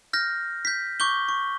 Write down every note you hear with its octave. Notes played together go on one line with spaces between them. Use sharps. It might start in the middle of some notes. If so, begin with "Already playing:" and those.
F6 G6 A#6
G6 B6
C#6 D6 G6 G7
C#6